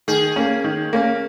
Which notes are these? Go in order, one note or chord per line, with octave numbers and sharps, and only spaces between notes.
D#3 G#4
A#3 C#4
D#3
A#3 C#4